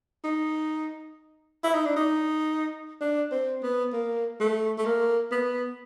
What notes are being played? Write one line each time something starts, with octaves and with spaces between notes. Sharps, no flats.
D#4
E4
D#4
D4
D#4
D4
C4
B3
A#3
A3
A3
A#3
B3